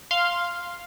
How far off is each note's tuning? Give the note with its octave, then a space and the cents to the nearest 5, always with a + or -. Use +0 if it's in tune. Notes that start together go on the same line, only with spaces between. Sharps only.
F5 +0 C6 +0